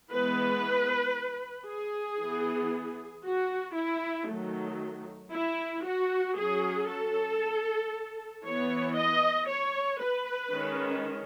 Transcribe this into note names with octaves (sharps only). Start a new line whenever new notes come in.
E3 G#3 B3 B4
G#4
E3 B3
F#4
E4
D#3 F#3 A3
E4
F#4
F#3 C#4 G#4
A4
E3 B3 C#5
D#5
C#5
B4
D#3 G#3 C#4